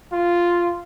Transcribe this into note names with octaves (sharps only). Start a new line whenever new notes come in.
F4